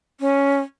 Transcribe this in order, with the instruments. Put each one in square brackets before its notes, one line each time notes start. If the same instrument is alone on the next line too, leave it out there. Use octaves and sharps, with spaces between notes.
[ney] C#4